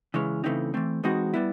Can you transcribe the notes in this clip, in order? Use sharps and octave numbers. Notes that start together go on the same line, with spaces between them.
C#3 E3 G#3 C#4
C#3 E3 A3 C4 D#4
E3 A3 C4
E3 G#3 C4 D#4 F#4
G3 B3 E4